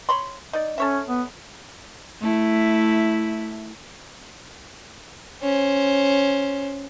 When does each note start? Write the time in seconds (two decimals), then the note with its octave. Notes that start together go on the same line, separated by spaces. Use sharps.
0.09 C#5 B5 C6
0.53 D#4 D5
0.78 C#4 A4 C#5 E5
1.07 B3
2.21 A3 E4
5.42 C#4 C5